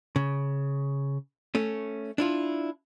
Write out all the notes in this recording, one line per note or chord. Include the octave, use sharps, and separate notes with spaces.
C#3
A3 C#4
D4 E4 F4